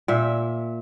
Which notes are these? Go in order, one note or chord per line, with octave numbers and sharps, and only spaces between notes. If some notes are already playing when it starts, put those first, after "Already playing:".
A#2 E5